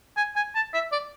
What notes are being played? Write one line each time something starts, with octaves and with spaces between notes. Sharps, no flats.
G#5
G#5
A5
E5
D5